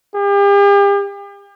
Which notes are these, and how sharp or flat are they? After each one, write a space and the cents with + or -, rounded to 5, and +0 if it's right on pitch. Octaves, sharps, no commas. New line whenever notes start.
G4 +40